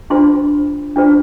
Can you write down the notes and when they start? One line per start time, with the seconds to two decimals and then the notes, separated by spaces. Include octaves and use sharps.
0.10 D4 F4 C5 C6
0.96 D4 F4 C5